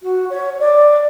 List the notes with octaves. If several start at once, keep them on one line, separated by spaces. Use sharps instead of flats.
F#4
C#5
D5